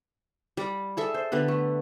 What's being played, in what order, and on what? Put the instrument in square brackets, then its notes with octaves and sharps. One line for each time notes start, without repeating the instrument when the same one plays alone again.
[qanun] G3 D5 D6
G#4 A4 E5
C5
D3 B3 G4 B4
A3